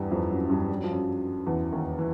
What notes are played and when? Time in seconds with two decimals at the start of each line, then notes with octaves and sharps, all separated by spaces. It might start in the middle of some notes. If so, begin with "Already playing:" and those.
Already playing: E2 G2 E3 G3
0.11 F2 F3
0.30 F#2 F#3
0.50 G2 G3
0.69 G3
0.77 F#3
0.84 F3
0.90 F#2 F#3
1.47 E2 E3
1.72 D#2 D#3
1.98 E3